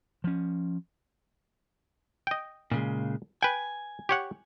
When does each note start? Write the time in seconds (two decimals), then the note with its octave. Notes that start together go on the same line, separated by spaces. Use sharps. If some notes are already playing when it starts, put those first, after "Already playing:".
0.24 F3 C#4
2.27 D#5 G5
2.72 A#2 C#3 G#3
3.43 B4 G5 G#5
4.09 G4 C#5 F#5